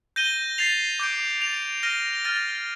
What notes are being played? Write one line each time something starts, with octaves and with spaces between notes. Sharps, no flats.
G6 A#6 D#7 G7
A6 C7 F7
D6 G6 D7
A6 D7 F7
F6 A#6 D#7 G7
F6 A6 D#7 G7